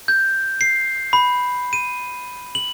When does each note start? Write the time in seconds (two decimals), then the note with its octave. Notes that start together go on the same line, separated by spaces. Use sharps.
0.08 G6
0.61 C7
1.13 B5
1.73 D#7
2.55 F#7